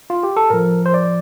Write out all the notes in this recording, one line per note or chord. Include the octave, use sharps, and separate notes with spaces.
F4
G4
A4
A2 F3 A#4
C5
D5